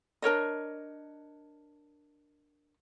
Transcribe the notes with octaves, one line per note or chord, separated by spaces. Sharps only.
D4 A#4 C#5 D#5